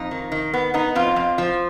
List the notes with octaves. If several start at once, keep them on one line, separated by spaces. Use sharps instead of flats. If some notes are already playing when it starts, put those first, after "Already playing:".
Already playing: F2 D#4
D#3
D#3
B3
B3 D#4
F2 F4
F2
F3